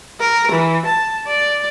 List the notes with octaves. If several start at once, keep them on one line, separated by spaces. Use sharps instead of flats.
A#4
E3
A5
D5